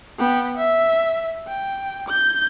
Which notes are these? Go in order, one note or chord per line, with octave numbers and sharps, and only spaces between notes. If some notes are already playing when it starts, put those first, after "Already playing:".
B3 G5
E5
G5
G6